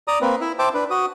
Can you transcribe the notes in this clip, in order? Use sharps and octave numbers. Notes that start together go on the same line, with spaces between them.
D5 A#5 D#6
A#3 C4 B4
E4 E5
C5 E5 G5 A5 D6
D4 B4
F#4 D#6